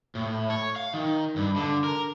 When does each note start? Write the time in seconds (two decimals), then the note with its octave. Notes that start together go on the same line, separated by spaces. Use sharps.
0.15 A2
0.50 C#5
0.76 F5
0.94 D#3
1.36 G2
1.56 D3
1.84 A#4